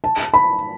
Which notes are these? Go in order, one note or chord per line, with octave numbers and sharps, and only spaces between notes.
A5
B5